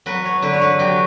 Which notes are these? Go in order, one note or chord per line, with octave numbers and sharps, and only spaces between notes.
F#3 B4
C#5
D3 B4
C#5
B4
F#3 G4